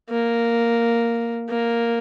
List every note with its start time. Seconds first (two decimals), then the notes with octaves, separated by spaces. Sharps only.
0.10 A#3
1.49 A#3